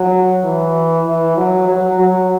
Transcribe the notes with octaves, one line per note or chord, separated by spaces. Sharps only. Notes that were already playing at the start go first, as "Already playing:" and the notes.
Already playing: F#3
E3
E3
F#3
F#3
F#3